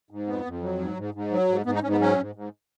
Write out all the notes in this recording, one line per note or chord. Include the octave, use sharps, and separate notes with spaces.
G#2
F2 B3
F2
F#3
G#2
G#2
G#2
F#3
G#2
G#2 B3
D#4
G#2 C#4
B3
F#3 C#4
G#2
G#2